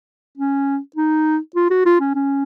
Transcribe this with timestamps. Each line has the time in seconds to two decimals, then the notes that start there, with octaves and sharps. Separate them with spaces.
0.37 C#4
0.96 D#4
1.55 F4
1.70 F#4
1.86 F4
2.00 C#4
2.15 C#4